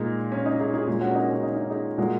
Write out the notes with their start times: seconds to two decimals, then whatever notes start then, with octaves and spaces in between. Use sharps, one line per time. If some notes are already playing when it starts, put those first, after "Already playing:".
Already playing: A#2 G#3 D#4
0.32 C#4
0.46 D#4
0.60 D#4 G#4
0.74 D#4 G#4
0.87 A#2 G#3
1.01 C#4 F#4
1.11 A#4
1.15 D#4 G#4
1.29 C#4 F#4
1.43 D#4
1.56 D#4
1.70 D#4 G#4
1.98 A#2 G#3 F#4 A#4